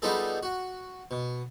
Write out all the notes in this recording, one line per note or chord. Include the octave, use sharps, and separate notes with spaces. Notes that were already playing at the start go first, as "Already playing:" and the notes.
G3 B3 D#4 F4 G#4 A4
F#4
B2